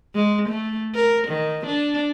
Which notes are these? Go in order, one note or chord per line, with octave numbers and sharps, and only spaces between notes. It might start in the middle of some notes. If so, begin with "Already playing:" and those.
G#3
A3
A#4
D#3
D4